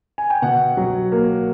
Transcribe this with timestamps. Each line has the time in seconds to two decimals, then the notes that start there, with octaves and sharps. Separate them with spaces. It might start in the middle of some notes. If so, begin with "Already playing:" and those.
0.18 G#5
0.30 G5
0.42 B2 F#5
0.77 F#3
1.12 A#3